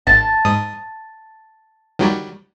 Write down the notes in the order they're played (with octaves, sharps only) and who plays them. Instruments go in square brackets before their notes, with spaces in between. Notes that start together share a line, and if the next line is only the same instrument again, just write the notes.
[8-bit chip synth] G#1 [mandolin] A5
[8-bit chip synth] G#2 D#6
D#3 F#3 G3